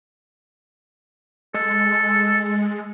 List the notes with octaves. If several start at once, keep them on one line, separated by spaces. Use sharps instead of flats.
G#3 A4